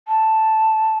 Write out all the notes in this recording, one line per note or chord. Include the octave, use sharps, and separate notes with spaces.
A5